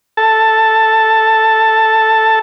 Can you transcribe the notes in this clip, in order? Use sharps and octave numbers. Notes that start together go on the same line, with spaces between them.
A4 A5